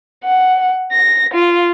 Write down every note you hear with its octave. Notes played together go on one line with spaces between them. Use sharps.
F#5
A#6
F4